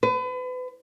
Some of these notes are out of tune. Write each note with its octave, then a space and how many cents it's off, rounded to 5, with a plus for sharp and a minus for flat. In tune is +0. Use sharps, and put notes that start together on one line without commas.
B4 +35